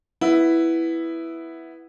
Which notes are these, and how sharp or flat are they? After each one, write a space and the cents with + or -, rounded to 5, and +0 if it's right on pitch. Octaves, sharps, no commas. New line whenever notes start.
B3 +0 E4 +0